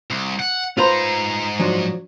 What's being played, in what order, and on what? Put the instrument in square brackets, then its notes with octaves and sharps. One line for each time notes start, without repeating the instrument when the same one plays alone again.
[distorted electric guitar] C2
F#5
[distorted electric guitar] G#2 A#5 [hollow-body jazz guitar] F4 B4 C5
[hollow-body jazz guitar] F3 F#3 D4